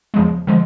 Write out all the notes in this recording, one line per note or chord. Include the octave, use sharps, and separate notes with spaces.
E2 C#3 F3 G#3
D3 F3 G#3